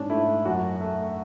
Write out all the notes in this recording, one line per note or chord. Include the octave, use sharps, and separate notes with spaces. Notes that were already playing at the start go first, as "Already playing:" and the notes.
Already playing: G#2 C#4 D4
A3 E4
F#2 F#4
A3